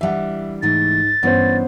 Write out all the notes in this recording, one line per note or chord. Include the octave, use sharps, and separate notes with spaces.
E3 G3 D4 E5 F#5
G#2 C3 E3 A3 A6
G2 E3 B3 C#4 C5